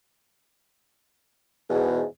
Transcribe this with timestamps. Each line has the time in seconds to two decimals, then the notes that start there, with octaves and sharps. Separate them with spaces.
1.68 E2
1.71 B2
1.74 G#2